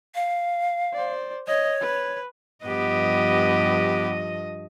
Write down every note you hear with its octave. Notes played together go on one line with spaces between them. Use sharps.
F5
C5 D5
C#5 D#5
B4
G2 F3 B3 G4 D#5